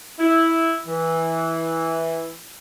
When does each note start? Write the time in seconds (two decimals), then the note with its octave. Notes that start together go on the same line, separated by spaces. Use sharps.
0.19 E4
0.87 E3